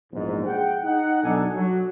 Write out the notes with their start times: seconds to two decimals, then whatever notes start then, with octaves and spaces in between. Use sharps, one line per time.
0.12 A#1 E2 G#2
0.45 G#4 F#5 G5
0.83 D#4 F#5
1.22 B1 D4 D#4 A4 G#5
1.54 F#3